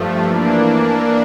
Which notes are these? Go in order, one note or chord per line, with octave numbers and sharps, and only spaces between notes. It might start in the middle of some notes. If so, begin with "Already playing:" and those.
Already playing: G2 F3 A3
E3 A#3 D4